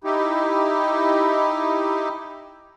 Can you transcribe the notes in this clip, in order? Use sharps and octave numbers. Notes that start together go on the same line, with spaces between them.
D#4 E4 G4